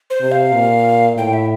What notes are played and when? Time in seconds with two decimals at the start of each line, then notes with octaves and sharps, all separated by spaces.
0.10 C5
0.21 C3
0.32 F5
0.53 A#2
1.17 A2 G5
1.33 E5